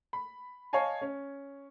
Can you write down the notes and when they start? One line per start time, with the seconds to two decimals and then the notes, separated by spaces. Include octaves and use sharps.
0.13 B5
0.73 C#5 D#5 F5 G#5 A5
1.01 C#4